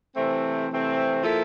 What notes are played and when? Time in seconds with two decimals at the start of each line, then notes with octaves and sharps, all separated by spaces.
0.16 C3 E3 A3 C4
0.70 C3 E3 A3 C4
1.22 F3 A#3 E4 A4